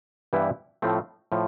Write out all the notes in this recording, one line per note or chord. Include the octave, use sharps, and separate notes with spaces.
G2 E3 G3 B3 E4
A2 F3 A3 C4
A2 F3